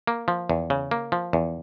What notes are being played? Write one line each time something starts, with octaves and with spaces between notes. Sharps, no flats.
A#3
F3
E2
C#3
A#3
F3
E2